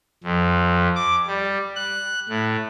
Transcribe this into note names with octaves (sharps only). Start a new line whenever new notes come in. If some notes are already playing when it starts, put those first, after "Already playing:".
F2
D6
G3
F#6
A2